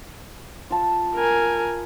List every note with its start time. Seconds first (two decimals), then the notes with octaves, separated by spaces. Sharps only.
0.70 F4 A5
1.15 A#4 G#5